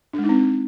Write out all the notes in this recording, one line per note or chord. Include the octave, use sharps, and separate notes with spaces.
D4
G#3
D#4
C4